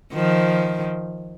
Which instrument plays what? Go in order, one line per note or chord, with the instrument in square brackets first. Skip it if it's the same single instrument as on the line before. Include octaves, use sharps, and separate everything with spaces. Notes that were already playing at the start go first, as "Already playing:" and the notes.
[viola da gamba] D#3 F3